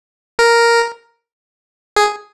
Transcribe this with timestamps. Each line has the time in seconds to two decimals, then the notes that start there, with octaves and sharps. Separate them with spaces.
0.39 A#4
1.96 G#4